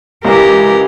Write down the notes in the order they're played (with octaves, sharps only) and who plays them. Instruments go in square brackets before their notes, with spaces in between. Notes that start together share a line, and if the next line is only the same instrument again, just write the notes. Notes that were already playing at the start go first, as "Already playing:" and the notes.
[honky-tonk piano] C#2 E3 [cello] G4 A#4